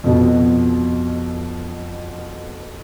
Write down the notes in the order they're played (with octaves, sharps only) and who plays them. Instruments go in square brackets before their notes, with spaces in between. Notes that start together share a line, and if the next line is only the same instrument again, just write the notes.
[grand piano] F2 B2